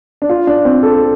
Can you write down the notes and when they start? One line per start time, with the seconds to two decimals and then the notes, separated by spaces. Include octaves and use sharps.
0.22 D4
0.29 F4
0.47 D4
0.65 C4
0.83 A4